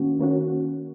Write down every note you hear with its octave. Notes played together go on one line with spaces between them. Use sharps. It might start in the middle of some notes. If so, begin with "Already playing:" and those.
Already playing: D#3 A#3 C#4 F#4
D#3 A#3 C#4 F#4